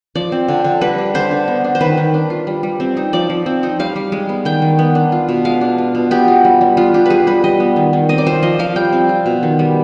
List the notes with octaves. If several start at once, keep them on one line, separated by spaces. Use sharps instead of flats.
F3 D5
C4
D3
D3
G3 B4
D4
D3 C5
D3
B3
D4
C5
D#3 B4
D#3
D4
F4
G3
G3
C4
D#4
F3 D5
F3
C4
D#4
G3 F5
G3
G#3
B3
D#3 G5
D#3
B3
D4
F4
B2
G#3 F5
D4
F4
B2
B3 G4
F4
G3
G3
B3 F4
D4 G4
G3 G#4 B4
G3 B4
G3 D#5
B3
D#3
D#3
C4 D#5
D5
F4 C5
F3 D#5
F3 F5
G3 G5
C4
F4
B2
D#3
G3